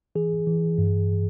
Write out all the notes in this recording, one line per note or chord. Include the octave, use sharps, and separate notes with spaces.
E3 G#4
E3
G2